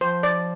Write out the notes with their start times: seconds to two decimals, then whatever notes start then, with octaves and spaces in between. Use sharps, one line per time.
0.01 F3 C5
0.23 D5